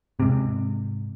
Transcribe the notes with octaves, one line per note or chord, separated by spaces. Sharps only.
G#2 C3